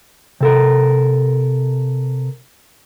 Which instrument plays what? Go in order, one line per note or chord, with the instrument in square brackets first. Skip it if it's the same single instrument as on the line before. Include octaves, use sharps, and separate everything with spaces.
[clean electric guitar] C3 A4 A#4